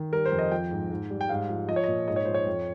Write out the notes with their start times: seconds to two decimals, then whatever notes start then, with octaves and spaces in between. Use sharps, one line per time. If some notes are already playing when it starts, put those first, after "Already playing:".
Already playing: D#3
0.12 G3 A#4
0.26 C5
0.32 F2
0.39 D#5
0.51 F3 G5
0.71 G#2
0.91 G#2
1.10 G3
1.21 G5
1.29 G#2 F5
1.49 F3
1.68 F3 D#5
1.76 C#5
1.84 A#2 D#5
2.08 G#2 D#5
2.16 C#5
2.25 F3 C5
2.34 C#5
2.47 F2